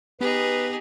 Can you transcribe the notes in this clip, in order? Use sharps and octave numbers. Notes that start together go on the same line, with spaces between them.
B3 D#4 G4 G#4 B4